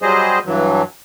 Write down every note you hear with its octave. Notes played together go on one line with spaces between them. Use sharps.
F#3 G3 G#4 C5 D#5
G2 E3 F#3